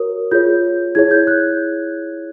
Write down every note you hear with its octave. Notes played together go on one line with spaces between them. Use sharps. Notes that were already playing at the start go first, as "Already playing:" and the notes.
Already playing: F#4 A#4 C#5 D#6
F4 G#4 C#5 G6
E4 G#4 C#5 G#6
G6
F#6